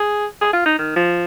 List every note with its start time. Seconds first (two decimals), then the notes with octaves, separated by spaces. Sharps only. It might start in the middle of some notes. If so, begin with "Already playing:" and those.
Already playing: G#4
0.41 G#4
0.53 F4
0.66 D#4
0.78 D#3
0.96 F3